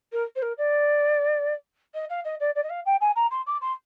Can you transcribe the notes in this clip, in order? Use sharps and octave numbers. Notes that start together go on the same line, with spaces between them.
A#4
C5
A#4
D5
D#5
F5
D#5
D5
D5
D#5
F5
G5
G#5
A#5
C6
D6
C6